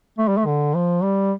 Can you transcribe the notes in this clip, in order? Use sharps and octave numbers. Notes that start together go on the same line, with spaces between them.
A3
G3
A3
D3
F3
G3